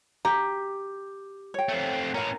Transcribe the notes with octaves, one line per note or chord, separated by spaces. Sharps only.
G4 A#5
C#5 G5
A3 C4
A2 C#4 A#4 F5